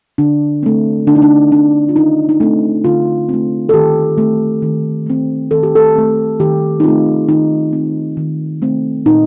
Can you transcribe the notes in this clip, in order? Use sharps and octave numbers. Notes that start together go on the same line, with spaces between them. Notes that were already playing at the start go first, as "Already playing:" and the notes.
D3 D4
A3 C4
D3 D4
D#4
D4
A3 C4 D4
F4
D3 D#4
D#4
A3 C4 D4
D3 F4
A3 C4
A4
D#3 G4
A3 C4
D#3
A3 C4
D#3 A4
G4
A4
A3 C4
D#3 G4
D#4
A3 C4 F4
D#3 D#4
A3 C4
D#3
A3 C4
A#2 D#4